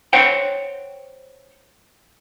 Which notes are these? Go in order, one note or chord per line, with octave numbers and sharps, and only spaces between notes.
C5 C#5 F#5 G5